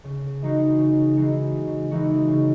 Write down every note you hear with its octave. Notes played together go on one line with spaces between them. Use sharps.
C#3
E3 G#3 D#4 F#4
C#3
E3 G#3 D#4 F#4
C#3
E3 G#3 D#4 F#4
C#3